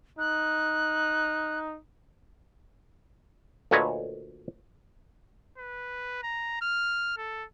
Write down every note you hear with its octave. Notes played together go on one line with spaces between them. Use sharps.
D#4 F#6
D2 A#2 A4 B4 C#5 D#5
B4
A#5
F6
A4